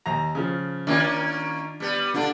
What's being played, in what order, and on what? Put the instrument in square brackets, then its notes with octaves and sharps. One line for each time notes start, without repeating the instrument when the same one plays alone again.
[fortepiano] D#2 A#5
C#3 F3
[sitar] D#3 A#3 C#4 [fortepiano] D4 F4
[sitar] G3 B3
[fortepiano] D3 [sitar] D4 F4